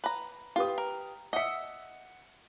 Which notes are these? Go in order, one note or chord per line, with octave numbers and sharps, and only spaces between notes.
B4 A#5
F4 G4 B4 D#6
A#4
D#5 E5 F#5 C#7